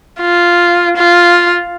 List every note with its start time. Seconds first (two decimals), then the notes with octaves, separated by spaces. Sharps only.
0.21 F4
0.97 F4